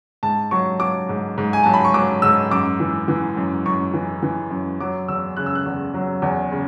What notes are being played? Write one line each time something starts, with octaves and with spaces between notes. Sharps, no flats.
G#2 A5
F#3 C#6
F#3 D6
G#2
G#2
G#5
F#3 A5
B5
C#6
F#3 D6
G#2 E6
F#2 D6
E3
E3
F#2
F#2 C#6
E3
E3
F#2
F#3 D6
E2 E6
C#3 F#6
E6
F#6
E2
F#3
E2
C#3